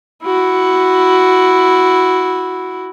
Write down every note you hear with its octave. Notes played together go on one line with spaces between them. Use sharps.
E4 F#4